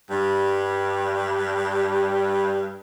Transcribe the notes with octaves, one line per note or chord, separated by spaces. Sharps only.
G2 G3